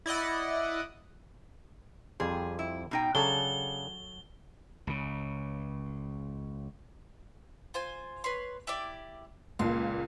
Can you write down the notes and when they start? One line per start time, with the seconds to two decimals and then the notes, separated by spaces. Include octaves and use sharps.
0.06 E4 D5 D#5 F#5
2.20 F2 G3 G#4 C5
2.59 E4
2.91 B2 D#4 G5
3.15 C#3 F#3 D4 A4 A5 G7
4.87 C#2 C#3
7.74 F4 C5 G#5
8.24 B4 C#5 C6
8.67 E4 G4 D5
9.59 C#2 A#2 C6